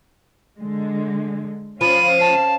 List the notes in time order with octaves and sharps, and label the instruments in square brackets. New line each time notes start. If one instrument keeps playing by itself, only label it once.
[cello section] D3 G#3
[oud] F3 [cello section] C#4 F5 [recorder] B5 [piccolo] D#7
[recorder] A5